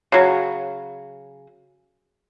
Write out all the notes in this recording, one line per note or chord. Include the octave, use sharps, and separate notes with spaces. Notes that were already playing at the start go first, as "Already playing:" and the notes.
C#3 F#3